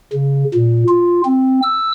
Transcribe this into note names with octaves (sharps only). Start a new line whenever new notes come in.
C#3
A#2
F4
C4
E6